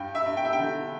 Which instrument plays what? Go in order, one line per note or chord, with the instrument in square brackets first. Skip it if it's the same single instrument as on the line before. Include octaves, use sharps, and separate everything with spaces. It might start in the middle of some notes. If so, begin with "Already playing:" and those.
Already playing: [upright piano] G2 G5
E5
G2
G5
E5
G5
D3